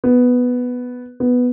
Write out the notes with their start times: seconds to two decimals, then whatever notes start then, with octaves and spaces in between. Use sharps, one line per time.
0.04 B3
1.20 B3